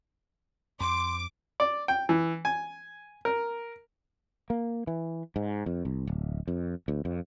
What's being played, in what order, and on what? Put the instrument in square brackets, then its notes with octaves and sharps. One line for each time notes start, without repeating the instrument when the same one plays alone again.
[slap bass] F2 [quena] C6 [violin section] D6
[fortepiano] D5
G5
E3
G#5
A#4
[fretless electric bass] A#3
E3
G#2
F2
C2
D1
F2
D2
F2